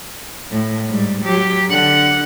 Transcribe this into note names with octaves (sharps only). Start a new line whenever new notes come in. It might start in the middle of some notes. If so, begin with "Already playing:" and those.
A2
G#2 G3
F#3 G4
D3 F#5